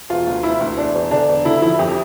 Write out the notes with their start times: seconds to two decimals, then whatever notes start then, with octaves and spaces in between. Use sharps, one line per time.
0.10 E1 F4
0.27 D2
0.43 E1 E4
0.61 D2
0.77 E1 D4
0.95 E1
1.11 D3 D4
1.29 E1
1.45 D3 E4
1.62 F3 E4
1.79 F2 G4